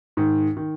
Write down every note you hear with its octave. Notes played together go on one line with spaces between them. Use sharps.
G#2 D#3
D#3